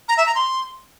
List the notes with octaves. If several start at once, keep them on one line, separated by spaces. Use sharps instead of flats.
A#5
E5
A#5
C6